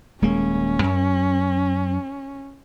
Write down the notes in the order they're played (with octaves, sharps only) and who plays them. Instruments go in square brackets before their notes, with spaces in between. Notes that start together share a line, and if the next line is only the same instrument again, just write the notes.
[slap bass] D#1 G#3 A#3 [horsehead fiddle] C#4
[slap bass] F#2